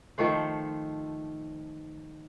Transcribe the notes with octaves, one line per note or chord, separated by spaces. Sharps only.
D#3 F3 A3 C5